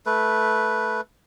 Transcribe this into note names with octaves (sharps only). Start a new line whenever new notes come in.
A3 B4